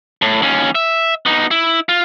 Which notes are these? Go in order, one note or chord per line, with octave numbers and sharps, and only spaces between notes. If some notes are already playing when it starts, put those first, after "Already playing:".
A2
D#2 C#4
E5
B3 D#4
E4
F4